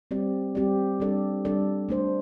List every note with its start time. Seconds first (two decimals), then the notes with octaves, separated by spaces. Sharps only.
0.11 G3 C4 G4 D5
0.55 G3 C4 G4 D5
1.00 G3 D4 A4 D5
1.45 G3 D4 A4 D5
1.89 A3 D4 C5